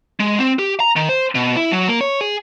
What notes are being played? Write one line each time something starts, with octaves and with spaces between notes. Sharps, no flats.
G#3
C4
G4
A#5
D#3
C5
B2
E4
F#3
A#3
C#5
G#4